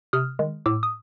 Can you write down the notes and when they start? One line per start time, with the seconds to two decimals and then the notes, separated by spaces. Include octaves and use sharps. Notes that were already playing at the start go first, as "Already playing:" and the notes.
0.13 C3 D#6 F6
0.39 D#3 G#3
0.66 A2 D6 E6
0.83 D#6